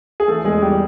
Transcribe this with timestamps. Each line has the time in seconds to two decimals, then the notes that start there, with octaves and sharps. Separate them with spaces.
0.20 G#4
0.28 E3 A3 A4
0.44 E2 G#3 G#4
0.61 E3 G3 G4